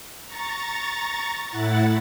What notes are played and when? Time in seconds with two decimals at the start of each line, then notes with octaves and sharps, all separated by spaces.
0.25 A#5 C#6 A6
1.48 A2 E4 F#5 A6